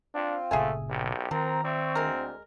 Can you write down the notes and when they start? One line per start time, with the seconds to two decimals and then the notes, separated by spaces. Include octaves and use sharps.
0.14 C4 D4 F4
0.51 G1 A#2 C#3 A3 G#4 E5 G#5
0.90 B1 G4
1.31 D#3 F3 C4 A#4 A#5
1.64 C4 D5 E5 C#6
1.95 D2 G#3 A#4